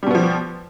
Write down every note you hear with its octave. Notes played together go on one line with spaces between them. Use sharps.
B2 F3 G3 B3